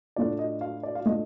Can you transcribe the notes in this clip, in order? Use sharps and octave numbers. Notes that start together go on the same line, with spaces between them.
A2 A3 D4 F4 D5
D#5
F5
D5
F5
A2 A3 D4 F4 D#5